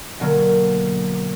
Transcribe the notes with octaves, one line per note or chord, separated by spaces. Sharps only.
B2 D3 F#3 A#3